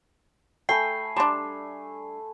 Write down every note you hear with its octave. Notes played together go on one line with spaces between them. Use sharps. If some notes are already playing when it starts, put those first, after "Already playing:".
A3 G5 G#5 B5 C7
G3 D4 A5 A#5 C6